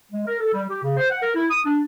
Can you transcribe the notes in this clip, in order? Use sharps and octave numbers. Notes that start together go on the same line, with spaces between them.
G#3
A#4
A4
G3
G4
C#3
C5
F#5
A#4
E4
D#6
D4